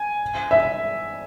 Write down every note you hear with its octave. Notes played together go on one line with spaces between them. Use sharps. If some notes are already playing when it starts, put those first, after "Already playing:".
Already playing: G#5
E5